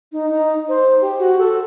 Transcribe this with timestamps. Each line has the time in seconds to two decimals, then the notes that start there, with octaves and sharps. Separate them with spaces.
0.12 D#4
0.30 D#4
0.69 C5
1.01 G4
1.19 F#4
1.39 A4